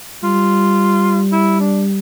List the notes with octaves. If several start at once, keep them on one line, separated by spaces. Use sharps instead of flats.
G3 F4
E4
D4